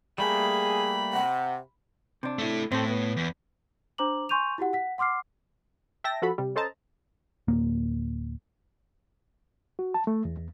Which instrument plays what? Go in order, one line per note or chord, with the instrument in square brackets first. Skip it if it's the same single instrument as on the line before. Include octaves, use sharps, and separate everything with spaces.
[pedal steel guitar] G3 A3 A#3 [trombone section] G#4 [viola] B5
[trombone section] C3 [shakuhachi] F#5
[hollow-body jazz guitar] C3 D4
[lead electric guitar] A3 E4
[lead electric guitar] A2 [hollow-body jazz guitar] C4 A4
[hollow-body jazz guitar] B3
[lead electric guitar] E2
[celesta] D4 C5 A#5 D6 F#7
G#5 C6 C#6 G6 D#7 F7
E4 F#4 G4 F#5
F#5 B6
F#5 C6 D6 F6 C7
[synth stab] E5 G5 A5 A#6
F3 F#4 A4 B5
C3 G3
C#4 A4 C5 D#5 A5 A#5
[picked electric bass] D1 A#3
[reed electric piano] F#4
A5
A3
E2
E2